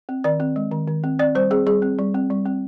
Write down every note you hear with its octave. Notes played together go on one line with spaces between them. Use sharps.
C4
D#3 D5
C4
G#3
D#3
D#3
C4
C4 D5
G3 C5
C4 G#4
G3 G#4
C4
G3
C4
G3
C4